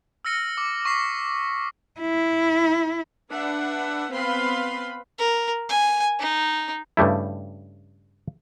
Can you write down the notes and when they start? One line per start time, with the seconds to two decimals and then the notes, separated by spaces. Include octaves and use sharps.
0.25 E6 F6 A#6 C#7 D#7
0.57 D6
0.85 C#6 B6 C7
2.01 E4
3.30 D4 B4 E5 F#5
4.13 B3 C4 B4 F5 B5 C6
5.19 A#4
5.69 G#5
6.20 D#4
6.97 G2 C#3 G3 A3 E4